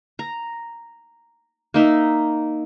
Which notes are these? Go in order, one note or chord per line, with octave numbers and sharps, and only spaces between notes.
A#5
A#3 D#4 E5